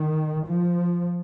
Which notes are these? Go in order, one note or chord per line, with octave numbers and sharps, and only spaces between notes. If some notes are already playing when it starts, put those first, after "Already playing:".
Already playing: D#3
F3